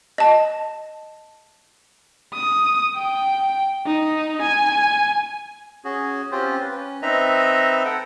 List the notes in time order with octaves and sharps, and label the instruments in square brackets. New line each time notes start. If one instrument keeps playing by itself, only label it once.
[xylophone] D#5 A5
[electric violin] D#6
G5
D#4
G#5
[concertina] C#4 F#4 G#4
C4 C#4 F4 G4 C5
B4
C#4
C4 D#4 B4 D#5 E5 A#5
A4 F#5 G5